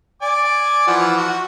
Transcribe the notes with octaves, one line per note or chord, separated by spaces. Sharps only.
D5 G#5 D6
E3 F3 F#5
F#4